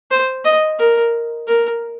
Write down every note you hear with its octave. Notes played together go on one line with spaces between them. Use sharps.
C5
D#5
A#4
A#4